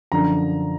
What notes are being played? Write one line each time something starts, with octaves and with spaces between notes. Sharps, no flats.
F#2 D3 F3 A#5